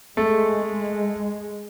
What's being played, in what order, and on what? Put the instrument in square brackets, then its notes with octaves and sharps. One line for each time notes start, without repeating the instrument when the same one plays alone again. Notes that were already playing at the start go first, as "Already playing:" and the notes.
[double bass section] G#3 [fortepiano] A3